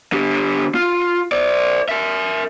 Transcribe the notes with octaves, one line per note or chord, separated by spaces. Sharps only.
D3 G4
F4
C5 D5
A#4 E5